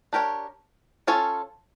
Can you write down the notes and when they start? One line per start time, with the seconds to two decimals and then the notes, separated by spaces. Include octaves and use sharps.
0.13 D4 G4 A#4 C#5
1.07 C#4 F4 A4 C#5